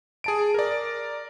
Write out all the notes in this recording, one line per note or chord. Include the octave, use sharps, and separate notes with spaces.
G#4 A5 D7
A#4 D5